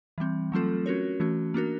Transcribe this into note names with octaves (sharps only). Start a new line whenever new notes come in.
E3 G3 C4
F#3 A3 C4 F4 A4
C#4 F#4 A#4 C#5
E3 A3 C#4 F#4
A#3 D4 F#4 A#4